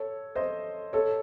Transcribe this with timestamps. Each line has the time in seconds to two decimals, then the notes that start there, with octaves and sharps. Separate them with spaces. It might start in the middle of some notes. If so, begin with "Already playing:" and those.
Already playing: A4 C#5
0.35 C5 D#5
0.93 A4 C#5